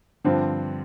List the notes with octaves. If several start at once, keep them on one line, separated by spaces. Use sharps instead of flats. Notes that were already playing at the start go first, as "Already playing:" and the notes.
G2 D3 F3 C4